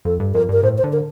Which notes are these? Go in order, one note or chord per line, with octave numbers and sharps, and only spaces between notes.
F2 A4
G2
F2 A#4
G2 A#4
A2 C5
C5
D3
A#4